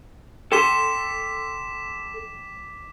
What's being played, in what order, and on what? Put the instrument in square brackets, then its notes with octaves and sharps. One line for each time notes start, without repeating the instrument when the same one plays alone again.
[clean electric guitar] A4 C6 [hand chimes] G5 [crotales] D6 B6 E7